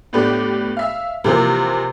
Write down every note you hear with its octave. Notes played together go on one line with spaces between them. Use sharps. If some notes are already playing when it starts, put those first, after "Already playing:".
A2 A3 B3 D4 G4
E5 F5
C3 E3 F3 A#3 C4